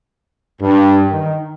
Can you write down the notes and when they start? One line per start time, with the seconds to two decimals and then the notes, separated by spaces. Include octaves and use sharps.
0.60 G2
1.10 D#3